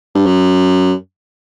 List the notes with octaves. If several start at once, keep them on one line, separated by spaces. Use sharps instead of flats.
G2
F#2